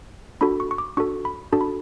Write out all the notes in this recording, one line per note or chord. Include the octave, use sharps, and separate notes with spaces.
D4 F#4 A4 B5
C#6
C#6
D6
D4 F#4 A4 C#6
B5
D4 F#4 A4 A5
B5